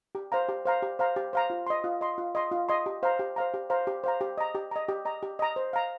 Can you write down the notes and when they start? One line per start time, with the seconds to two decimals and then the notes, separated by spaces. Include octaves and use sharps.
0.15 G4
0.32 C5 F5 A#5
0.49 G4
0.66 C5 F5 A#5
0.83 G4
0.99 C5 F5 A#5
1.16 G4
1.33 C5 F5 A#5
1.50 F4
1.67 D#5 C6
1.84 F4
2.01 D#5 C6
2.18 F4
2.35 D#5 C6
2.52 F4
2.69 D#5 C6
2.86 G4
3.03 C5 F5 A#5
3.19 G4
3.36 C5 F5 A#5
3.54 G4
3.70 C5 F5 A#5
3.87 G4
4.04 C5 F5 A#5
4.21 G4
4.38 D#5 A#5
4.55 G4
4.71 D#5 A#5
4.88 G4
5.05 D#5 A#5
5.23 G4
5.39 D#5 A#5
5.56 C5
5.73 F5 A#5